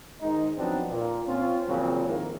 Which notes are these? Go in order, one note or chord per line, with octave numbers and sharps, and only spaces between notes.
G#2 D#3 G#3 D#4
F3 F#3 B3 C4 D4 D#4
A#2
C4 C#4 F4
E2 A#2 C#3 F3 F#3 C4
F2 G#2 D#3 G#3 A#3 E4